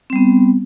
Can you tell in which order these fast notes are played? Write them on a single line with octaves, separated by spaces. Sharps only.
C4 G3 B3